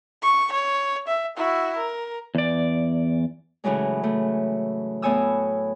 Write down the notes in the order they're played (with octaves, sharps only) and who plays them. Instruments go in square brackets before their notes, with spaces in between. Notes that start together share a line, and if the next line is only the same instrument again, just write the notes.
[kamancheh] C#6
C#5
E5
E4 F#4
A#4
[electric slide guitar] E2 D5
[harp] A2 C#3 E3 F#3 G#3
C#3 A3
A2 B3 C#5 G#5 D#6 E6